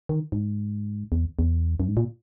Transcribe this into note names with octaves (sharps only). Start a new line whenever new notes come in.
D#3
G#2
E2
E2
F#2
G#2
A#2